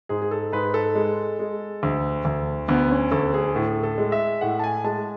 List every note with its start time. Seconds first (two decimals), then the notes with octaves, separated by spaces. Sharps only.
0.09 G#2 G#4
0.22 G#4
0.31 A4
0.52 G#2 B4
0.74 A4
0.95 G#3
1.39 G#3
1.83 D2
2.25 D2
2.68 D2 B3
2.91 C#4
3.11 D2 A4
3.34 G#4
3.55 A2 A4
3.83 A4
3.98 G#3
4.12 E5
4.41 A2 F#5
4.59 A5
4.64 G#5
4.84 G#3 A5